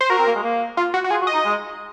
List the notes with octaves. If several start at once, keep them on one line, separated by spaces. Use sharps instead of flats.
C5
F#4 A#4
C4
A#3
G#3
A#3
F4
F#4
F#4
F4 G#4
F#4
D#5
D#4
G#3